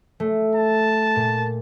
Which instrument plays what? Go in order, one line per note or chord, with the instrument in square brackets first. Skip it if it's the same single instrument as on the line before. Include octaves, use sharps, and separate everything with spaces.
[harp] A3
[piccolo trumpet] A5
[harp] A#2